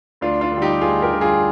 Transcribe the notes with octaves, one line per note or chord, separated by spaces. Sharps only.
D2 D4 F4
D4 F4
D3
G3
D#4 G4
D2 F4 G#4
G4 A#4
D3 G3
F4 G#4